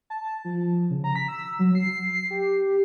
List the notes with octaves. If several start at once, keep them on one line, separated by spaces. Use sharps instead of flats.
A5
F3
C#3
A#5
B6
E6
F#3
C7
G4